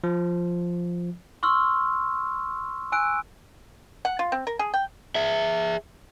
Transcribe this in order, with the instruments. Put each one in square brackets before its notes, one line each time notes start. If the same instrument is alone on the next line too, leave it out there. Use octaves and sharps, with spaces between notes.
[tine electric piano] F3
[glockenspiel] C6 C#6 E6 F6
G#5 E6 F#6 D7
[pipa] F#5
F4
C4
A#4
G#4
G5
[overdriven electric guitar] G#4 E5